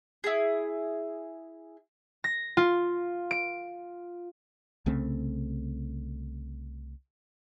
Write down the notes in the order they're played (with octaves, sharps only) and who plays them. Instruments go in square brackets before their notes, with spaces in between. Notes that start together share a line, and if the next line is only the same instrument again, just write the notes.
[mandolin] E4 G#4
[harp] A#6
F4
D7
[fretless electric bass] C2 C#3 A3 C4